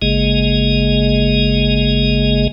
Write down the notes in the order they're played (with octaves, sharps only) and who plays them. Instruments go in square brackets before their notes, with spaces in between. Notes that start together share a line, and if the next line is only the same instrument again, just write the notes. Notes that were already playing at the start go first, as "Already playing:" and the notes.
[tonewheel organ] G#1 C#3 G#3 A#3 G#4 D#5